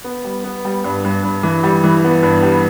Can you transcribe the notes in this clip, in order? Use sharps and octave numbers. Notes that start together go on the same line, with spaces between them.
B3
G3
B3
G3
G2
G2
G2
E3
G3
E3
B3
G2
G3